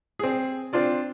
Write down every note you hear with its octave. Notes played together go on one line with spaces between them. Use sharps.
C4 G#4
C4 D4 F4 D5